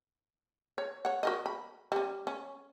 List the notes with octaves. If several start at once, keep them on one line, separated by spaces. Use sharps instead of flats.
C#5
C#5 F#5
F#4 A#4 D#5
B5
G3 C#4
C#4